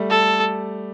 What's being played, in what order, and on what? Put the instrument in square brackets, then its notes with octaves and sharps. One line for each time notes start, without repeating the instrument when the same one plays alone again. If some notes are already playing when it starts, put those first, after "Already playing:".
Already playing: [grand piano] G3 A3
[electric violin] A4